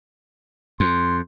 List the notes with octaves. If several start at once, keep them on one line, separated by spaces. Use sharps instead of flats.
F2 C6